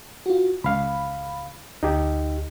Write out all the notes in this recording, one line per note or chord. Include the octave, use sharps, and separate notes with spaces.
F4 F#4
C#2 F5 B5
D2 D#4 G4